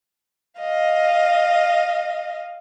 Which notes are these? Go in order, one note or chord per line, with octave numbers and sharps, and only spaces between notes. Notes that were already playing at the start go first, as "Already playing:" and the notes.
D#5 F5